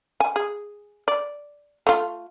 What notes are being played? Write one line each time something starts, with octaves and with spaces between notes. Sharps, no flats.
G#5
G#4
D5
A3 F4